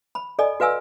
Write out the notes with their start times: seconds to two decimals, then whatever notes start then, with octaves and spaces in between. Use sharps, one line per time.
0.15 B5
0.39 A4 D5 D#5 G#5
0.60 F#4 B4 F5 G#5 E6